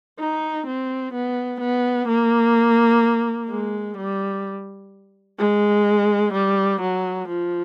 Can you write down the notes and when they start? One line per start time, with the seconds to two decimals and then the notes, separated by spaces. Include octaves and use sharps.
0.19 D#4
0.66 C4
1.13 B3
1.61 B3
2.08 A#3
3.50 G#3
3.97 G3
5.39 G#3
6.33 G3
6.81 F#3
7.28 F3